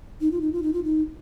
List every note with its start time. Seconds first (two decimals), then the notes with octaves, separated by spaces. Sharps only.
0.21 D#4
0.31 F4
0.41 D#4
0.53 F4
0.63 D#4
0.73 F4
0.84 D#4